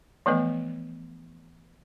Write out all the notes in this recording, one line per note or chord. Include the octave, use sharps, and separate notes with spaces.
E3 F3 A3 B3 B4 D#5